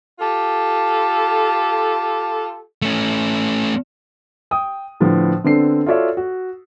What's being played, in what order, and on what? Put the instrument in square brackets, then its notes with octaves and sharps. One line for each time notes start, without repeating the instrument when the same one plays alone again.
[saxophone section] F4 G4 A4
[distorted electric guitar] A3 C#4
[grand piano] G5 D#6
A2 D3 F3 B3
D3 B3 C4 D4 A4 C7
F4 F#4 A4 C#5 D5 E5
F#4